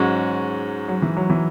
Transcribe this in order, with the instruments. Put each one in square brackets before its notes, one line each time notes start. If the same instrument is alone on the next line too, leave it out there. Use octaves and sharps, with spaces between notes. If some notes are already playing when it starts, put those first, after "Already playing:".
Already playing: [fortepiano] G#2 G#3 C#4 F#4 [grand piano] F#3
[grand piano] F#3
E3
F#3
E3